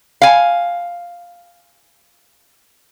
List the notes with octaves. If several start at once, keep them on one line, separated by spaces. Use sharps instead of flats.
F5 G#5